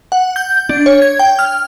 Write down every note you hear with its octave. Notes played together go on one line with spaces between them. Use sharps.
F#5
G6
D4
C#5
G#6
G5
F6